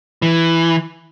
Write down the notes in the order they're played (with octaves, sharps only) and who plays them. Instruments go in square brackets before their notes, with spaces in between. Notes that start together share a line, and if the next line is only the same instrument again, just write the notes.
[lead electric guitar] E3